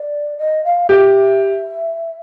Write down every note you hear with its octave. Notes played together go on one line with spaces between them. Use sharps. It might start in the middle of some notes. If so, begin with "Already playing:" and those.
Already playing: D5
D#5
F5
G4 E5